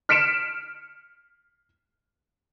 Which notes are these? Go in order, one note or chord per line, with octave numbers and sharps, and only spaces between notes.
F6 B6 C#7 D7 E7